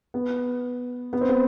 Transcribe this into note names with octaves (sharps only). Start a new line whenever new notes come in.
B3
B3
C4
B3